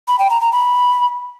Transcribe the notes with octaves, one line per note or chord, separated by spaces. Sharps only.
B5
G5
A#5
A#5
B5